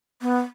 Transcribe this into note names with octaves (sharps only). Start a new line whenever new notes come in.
B3